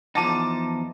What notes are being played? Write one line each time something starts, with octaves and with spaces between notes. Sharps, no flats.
E2 F3 D#4 A5 D6 D#7